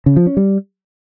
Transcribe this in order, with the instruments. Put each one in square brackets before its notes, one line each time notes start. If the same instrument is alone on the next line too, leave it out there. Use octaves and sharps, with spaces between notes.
[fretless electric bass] C#3
F3
C#4
G3